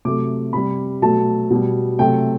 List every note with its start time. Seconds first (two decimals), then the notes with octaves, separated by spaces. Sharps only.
0.05 C3 F#3 A3 D6
0.53 C3 G3 B5
1.02 B2 F#3 A3 A5
1.51 B2 G3
1.99 C3 F#3 A3 G5